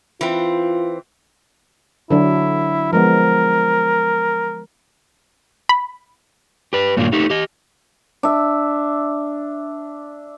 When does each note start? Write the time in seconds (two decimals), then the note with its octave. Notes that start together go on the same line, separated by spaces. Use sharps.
0.21 E3 C4 F4
2.10 D3 F#3 D4 E4
2.93 F3 G#3 B3 A#4
5.69 B5
6.73 G4 B4
6.97 G2 A#2 D#3 F#3 A#3 D4
7.13 A3 D#4 G4
7.30 G4 D#5
8.23 D4 E5